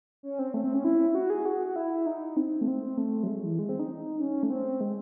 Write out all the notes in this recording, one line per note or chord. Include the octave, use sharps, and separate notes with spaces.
C#4
C4
A3
C4
C#4
E4
E4
F#4
G#4
F#4
F#4
E4
D#4
C4
A3
C4
A3
F#3
G#3
E3
G#3
C4
D#4
C#4
A3
C4
G#3